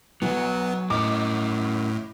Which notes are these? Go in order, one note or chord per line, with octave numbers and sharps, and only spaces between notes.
B1 F#3 B3
A2 C#4 A#4 D#5 D6